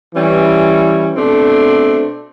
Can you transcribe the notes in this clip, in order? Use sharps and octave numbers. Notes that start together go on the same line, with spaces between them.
E3 G3 C#4
B2 A3 C4 D4